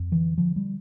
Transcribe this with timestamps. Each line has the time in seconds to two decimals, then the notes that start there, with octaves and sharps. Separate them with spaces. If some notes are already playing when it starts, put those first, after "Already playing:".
Already playing: F2
0.12 D3 E3
0.38 D3 F3
0.56 G3